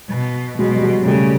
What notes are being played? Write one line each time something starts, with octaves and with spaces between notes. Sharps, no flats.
B2
B2 F#3 G#3
G3
F#3 G#3
C#3 G3 A3